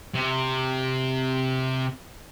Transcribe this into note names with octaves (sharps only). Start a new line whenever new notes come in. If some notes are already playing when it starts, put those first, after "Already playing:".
C3